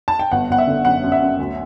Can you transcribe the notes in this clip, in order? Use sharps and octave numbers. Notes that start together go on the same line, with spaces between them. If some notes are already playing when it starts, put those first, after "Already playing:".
A5
G5
G1 F#5
G1 F#5
E5
D3
F#2 F#5
F#2
E5
F#2
D2